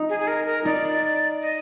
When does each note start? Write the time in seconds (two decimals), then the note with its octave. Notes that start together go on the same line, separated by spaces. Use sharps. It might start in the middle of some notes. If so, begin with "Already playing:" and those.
Already playing: D#4
0.09 G#4
0.20 G#4
0.28 A#4
0.46 A#4
0.65 D#4 D5
1.41 D#5